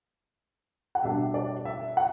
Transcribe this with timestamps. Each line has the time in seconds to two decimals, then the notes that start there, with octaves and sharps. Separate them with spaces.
0.95 F#5
1.03 B2 G3 D4 E5
1.34 D5
1.65 E5
1.97 F#5